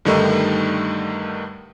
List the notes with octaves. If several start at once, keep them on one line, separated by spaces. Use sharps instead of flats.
G2 D3 D#3 G3 A3 D#4